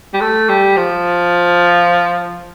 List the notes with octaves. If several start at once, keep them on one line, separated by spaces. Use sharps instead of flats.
G3
A3
G3
F3